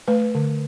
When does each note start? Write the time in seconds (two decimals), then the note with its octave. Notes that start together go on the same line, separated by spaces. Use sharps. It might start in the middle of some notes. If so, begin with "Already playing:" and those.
0.08 A3 B4
0.35 D3